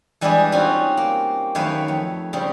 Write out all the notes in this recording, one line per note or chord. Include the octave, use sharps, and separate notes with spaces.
E3 G3 G#3 D4 E4 G#4
G3 C4 C#4 D#4 F4 F#4
A#3
F#2 D#3 A3 B4 C#5 F5
F2
C#3 G3 C4